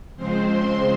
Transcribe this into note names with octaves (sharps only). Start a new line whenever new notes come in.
C#3 F3 G#3 C4 C5 C6